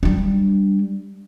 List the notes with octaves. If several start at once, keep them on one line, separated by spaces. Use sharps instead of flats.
G3 D4